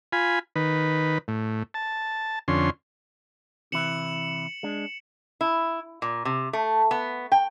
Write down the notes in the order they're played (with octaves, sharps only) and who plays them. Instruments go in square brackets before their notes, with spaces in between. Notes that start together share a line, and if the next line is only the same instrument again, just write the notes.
[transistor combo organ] F4 G#5 B5
D#3 B4
A2
A5
F2 D3 C#4 C6
[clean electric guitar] C3 E3 E4 [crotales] C#7 E7 F#7
[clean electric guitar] G#3 D4
[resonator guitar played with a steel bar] E4
A#2
C3
A3
B3
G5